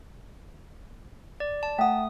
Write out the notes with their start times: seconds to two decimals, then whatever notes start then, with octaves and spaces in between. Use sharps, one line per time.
1.40 D5
1.63 A5
1.79 A3 F#5 G5 D#6